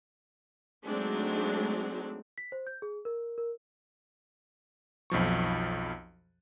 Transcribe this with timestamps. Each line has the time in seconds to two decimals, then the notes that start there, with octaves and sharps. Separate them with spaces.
0.85 F#3 G#3 A3 C4 D4 D#4
2.38 B6
2.52 C5
2.67 G6
2.82 G#4
3.05 A#4
3.38 A#4
5.10 B1 F2 F3 C#6